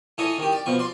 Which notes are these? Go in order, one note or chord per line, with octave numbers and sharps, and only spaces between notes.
E3 A4 C#5 D#5
D#3 G4
D5
B2 F3 C#6
D5 C6